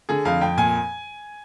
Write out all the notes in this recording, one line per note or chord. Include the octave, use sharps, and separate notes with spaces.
D3 G#4
F2 F5
F2 G5
A#2 G#5